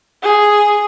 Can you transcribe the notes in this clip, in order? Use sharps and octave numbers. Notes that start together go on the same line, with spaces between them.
G#4